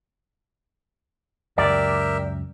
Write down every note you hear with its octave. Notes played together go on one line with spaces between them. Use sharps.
C#2 F#2 G4 A#4 D5 E5